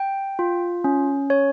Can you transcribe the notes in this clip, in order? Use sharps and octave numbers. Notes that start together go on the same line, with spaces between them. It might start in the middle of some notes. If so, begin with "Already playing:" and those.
Already playing: G5
F4
C#4
C#5